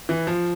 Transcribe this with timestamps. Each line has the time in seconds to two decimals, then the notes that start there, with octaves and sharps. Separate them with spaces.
0.09 E3
0.27 F3